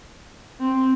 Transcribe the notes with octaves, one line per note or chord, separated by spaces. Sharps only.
C4